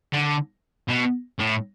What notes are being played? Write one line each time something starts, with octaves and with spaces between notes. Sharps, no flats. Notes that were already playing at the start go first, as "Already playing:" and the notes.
D3
B2
A2